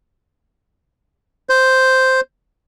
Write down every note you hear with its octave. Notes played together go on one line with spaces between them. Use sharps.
C5